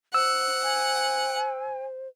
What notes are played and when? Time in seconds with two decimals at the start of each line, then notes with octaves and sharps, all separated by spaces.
0.14 C5 F#5 E6
0.63 G#5